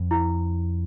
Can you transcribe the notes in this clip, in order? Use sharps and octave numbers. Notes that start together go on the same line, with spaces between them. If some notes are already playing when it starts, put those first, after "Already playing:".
Already playing: F2
E4